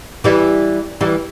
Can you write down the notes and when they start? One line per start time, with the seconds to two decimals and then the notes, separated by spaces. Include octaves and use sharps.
0.24 E3 G3
1.01 E3 G3